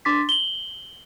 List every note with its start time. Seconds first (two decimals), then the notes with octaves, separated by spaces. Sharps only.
0.05 D4 C6 D6 A6 B6
0.29 F#7 G7